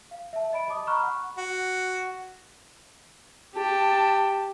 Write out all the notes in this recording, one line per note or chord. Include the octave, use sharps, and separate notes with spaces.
F5
E5 A5
D#5 B5 D7
D#5 A5 D6 D#6
A#5 B5 C#6 F6 F#6
F#5
F#4
G4 A5